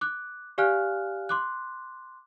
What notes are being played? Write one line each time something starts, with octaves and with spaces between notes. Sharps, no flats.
D6 F#6
G4 D5 F5 G#5 F6 F#6
C6 D6 F#6